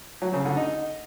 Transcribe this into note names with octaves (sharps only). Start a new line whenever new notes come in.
F#3
C#3
D3
D#4